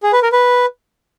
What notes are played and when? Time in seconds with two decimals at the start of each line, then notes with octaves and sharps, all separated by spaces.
0.03 G#4
0.13 B4
0.23 A#4
0.32 B4